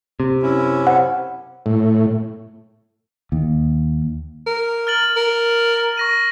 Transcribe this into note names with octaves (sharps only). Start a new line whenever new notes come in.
C3
F#2 C#4 E4
C5 F#5
A2
D#2
A#4
F6 A6 F#7
A#4
C#6 A#6 D#7